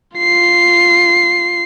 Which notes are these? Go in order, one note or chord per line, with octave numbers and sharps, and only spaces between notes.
F4 C7